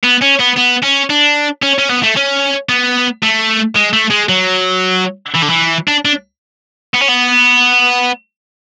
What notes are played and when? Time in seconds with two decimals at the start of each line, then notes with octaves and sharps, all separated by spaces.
0.03 B3
0.22 C#4
0.39 B3
0.56 B3
0.83 C#4
1.10 D4
1.63 C#4
1.79 C#4
1.89 B3
2.03 A3
2.16 C#4
2.69 B3
3.23 A3
3.76 G#3
3.93 A3
4.11 G#3
4.29 F#3
5.35 E3
5.43 D3
5.50 E3
5.88 D4
6.05 D4
6.95 B3
7.02 C#4
7.09 B3